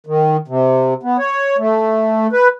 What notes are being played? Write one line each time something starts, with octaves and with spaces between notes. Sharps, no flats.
D#3
C3
B3
C#5
A3
B4